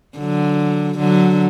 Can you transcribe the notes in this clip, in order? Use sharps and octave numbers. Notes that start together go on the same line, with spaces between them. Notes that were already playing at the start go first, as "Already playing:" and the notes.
D3 F#3
D3 F#3